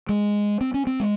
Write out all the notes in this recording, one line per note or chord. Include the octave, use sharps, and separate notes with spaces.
G#3
C4
C#4
C4
G#3